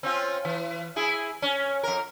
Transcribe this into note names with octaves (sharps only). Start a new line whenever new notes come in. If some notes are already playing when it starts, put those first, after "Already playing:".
C4 C#4 F4
E3
E4 G#4
C#4
F2 A#4